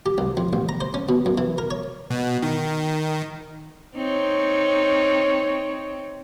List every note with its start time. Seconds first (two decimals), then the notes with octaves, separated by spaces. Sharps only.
0.06 G4
0.18 C2
0.37 F2
0.53 A1
0.69 A#5
0.81 C5
0.94 C#4
1.09 B2
1.26 F#2
1.38 E3
1.58 A#4
1.71 C#5
2.10 B2
2.42 D#3
3.96 C4 D#4 C#5